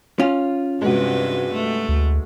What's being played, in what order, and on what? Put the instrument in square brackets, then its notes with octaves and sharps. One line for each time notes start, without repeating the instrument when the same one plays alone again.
[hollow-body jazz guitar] C#4 F4
[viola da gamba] G2 C3 B4 [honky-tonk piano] G#3 F#4
[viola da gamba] A3
[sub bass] D2